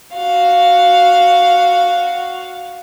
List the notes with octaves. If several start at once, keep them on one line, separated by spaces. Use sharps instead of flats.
F#4 F5